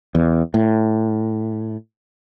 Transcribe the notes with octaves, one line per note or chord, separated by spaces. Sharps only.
E2
A2